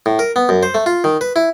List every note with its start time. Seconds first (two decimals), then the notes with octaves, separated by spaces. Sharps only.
0.06 A2
0.19 A#4
0.36 B3
0.49 F#2
0.63 C5
0.75 A3
0.86 F4
1.04 D#3
1.21 B4
1.36 E4